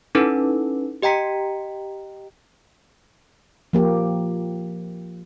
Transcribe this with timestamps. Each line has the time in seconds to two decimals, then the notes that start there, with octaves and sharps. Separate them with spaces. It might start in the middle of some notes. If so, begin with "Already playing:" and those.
0.15 C#4 D#4 E4 A4 B4
1.02 G4 D#5 G5 A#5 B6 C#7
3.73 F3 A#3 G4